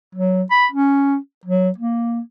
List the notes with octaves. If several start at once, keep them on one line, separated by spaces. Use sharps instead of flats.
F#3
B5
C#4
F#3
A#3